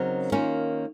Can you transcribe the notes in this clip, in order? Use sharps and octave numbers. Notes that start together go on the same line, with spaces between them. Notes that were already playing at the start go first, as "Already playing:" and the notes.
Already playing: C#3 F#3 C4 D#4 A#4
D#3 A#3 C#4 F4